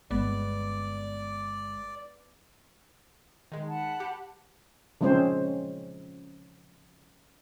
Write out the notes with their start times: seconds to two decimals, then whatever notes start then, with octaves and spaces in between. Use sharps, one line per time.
0.11 G1 G#3 B3 D5
3.52 D#3 G#3
3.68 F#5 A5 B5
4.00 G4
5.01 C#3 F3 G#3 C4 C#4 C5